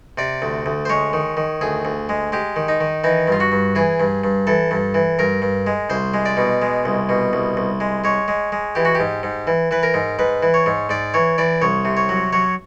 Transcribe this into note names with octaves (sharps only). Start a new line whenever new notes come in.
C3 D5
D2
D2
C5
G#3 C#5
D#3
D#3
D2 G#4
D2
G#3
G#3 G4
D#3
D#4
D#3
E3 D#4
G2 F4
F#4
G2
E3 G#4
G2
G2
E3 A4
G2
E3
G2 A#4
G2
G#3
C2 C5
G#3
D5
B2
G#3
C2
B2
C2
C2
G#3
G#3 C#5
G#3
G#3
E3 G4
F#4
G#2 G4
G#2
E3
E3 B4
A#4
G#2
G#2 B4
E3
C#5
G#2
G#2 D5
E3 C#5
E3 D5
C2 C#5
C3
C#5
F#3
F#3 C#5